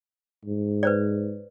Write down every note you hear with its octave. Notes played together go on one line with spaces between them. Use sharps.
G#2
B4 C5 D5